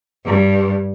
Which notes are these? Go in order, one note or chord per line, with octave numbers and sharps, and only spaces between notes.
G2